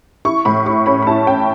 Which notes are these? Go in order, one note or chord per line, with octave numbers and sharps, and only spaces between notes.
E4 C#6
A2 B5
E4 C#6
C#4 B5
B5
E4 A5
C#4 G5